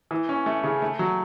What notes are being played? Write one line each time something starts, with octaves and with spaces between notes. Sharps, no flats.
E3
C#4
A3
C#3
A3
F#3